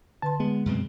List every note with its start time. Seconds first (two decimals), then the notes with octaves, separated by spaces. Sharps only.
0.22 D3 B4 A5 C6
0.40 G#3 B3
0.66 F#2 B2 C4